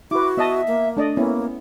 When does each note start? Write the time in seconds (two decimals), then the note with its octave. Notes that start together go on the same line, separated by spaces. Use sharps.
0.11 E4 F#4 B4 D6
0.37 B3 D#5 E5 A5
0.68 A#3
0.97 A3 D4 D5 D#5
1.17 A#3 B3 C#4 E4